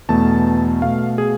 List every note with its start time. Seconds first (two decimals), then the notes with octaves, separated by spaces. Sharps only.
0.09 E2 B2 A3 A5
0.82 B2 A3 F5
1.18 G#4